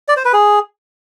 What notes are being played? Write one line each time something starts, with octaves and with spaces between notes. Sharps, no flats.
D5
C5
B4
G#4